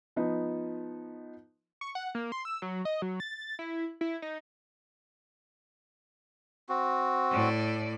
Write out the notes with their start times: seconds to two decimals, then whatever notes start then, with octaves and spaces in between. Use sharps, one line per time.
0.16 F3 B3 D#4
1.81 C#6
1.95 F#5
2.15 A#3
2.32 C6
2.45 E6
2.62 F#3
2.85 D#5
3.02 F#3
3.20 A6
3.59 E4
4.01 E4
4.22 D#4
6.69 C4 F#4
7.31 A2 D5